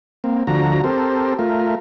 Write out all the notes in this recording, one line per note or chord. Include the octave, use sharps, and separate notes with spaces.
A#3 C4
D2 D3 F3 F#4 A#5
C4 G4 A4 A#4 C5
A3 F4 A#4